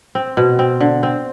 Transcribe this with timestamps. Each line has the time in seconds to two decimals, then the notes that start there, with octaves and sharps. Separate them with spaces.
0.15 C4
0.37 B2
0.59 C4
0.80 D3
1.03 C4